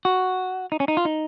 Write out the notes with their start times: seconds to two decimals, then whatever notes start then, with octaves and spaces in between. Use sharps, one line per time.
0.05 F#4
0.72 D#4
0.80 C#4
0.88 D#4
0.97 F4
1.05 D#4